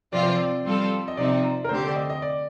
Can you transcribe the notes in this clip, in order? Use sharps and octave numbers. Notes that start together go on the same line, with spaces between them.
C3 F3 C4 F4 D5
C5
D5
G3 C4 F4 A4
D#5
C3 F3 C4 D#4 D5
A#4
D3 A3 C4 G4 C5
D5
D#5
D#5
D5